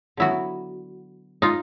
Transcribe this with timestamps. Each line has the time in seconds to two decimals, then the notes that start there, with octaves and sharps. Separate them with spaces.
0.17 D3 F#3 B3 E4 F#4
1.42 D#4 F4